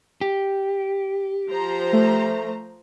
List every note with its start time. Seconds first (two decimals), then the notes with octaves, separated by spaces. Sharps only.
0.21 G4
1.49 F3 C5 A#5
1.93 A3